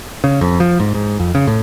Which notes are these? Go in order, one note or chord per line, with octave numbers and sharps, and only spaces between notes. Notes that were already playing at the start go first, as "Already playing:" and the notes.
C#3
F2
F3
G#2
G#2
F2
C#3
A2